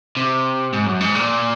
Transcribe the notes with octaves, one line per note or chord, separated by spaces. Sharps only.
C3
G#2
F#2
G#2
A#2